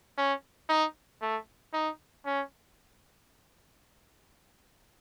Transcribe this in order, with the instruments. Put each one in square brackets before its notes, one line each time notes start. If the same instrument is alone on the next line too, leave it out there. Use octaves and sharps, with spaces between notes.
[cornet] C#4
D#4
A3
D#4
C#4